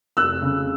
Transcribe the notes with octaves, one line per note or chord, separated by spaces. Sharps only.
F1 E6 F#6
C#3